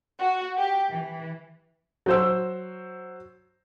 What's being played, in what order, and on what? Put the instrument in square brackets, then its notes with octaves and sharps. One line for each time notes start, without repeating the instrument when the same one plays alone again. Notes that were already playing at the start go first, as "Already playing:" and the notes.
[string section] F#4
G4
E3
[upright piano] F#3 C5 E6